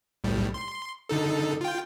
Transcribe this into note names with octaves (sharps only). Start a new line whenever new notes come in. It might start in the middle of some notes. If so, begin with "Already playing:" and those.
B1 A2 G3
C6
D3 D#4 A4
F4 G5